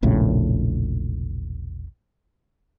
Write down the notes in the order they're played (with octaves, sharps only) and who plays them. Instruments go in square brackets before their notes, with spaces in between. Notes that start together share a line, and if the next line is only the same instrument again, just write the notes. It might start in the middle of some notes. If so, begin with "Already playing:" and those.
[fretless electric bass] E1 A#1 A2 C#3